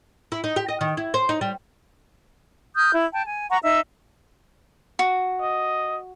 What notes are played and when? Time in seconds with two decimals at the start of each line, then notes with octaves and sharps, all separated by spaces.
0.32 E4
0.44 D#4
0.56 G4
0.68 D#5
0.81 D#3
0.97 E4
1.14 C5
1.29 D#4
1.41 G3
2.76 D#6 F6 G6
2.94 E4
3.13 G5 A5
3.26 G#5
3.50 F#5 A#5 C#6
3.63 D#4 E5 E6
4.99 F#4
5.41 D#5